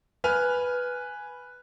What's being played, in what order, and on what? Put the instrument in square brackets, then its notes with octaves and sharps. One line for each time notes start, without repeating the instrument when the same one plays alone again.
[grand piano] B4 G#5 F6